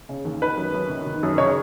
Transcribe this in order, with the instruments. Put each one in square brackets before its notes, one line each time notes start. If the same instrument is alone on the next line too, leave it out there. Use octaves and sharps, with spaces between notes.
[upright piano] C#3
D#2
D#3 B4
F#2
F#2
D#3
D#3
F#2
C#3 C#5